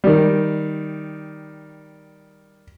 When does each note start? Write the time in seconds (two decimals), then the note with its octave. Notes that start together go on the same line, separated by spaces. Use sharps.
0.04 D#3 G3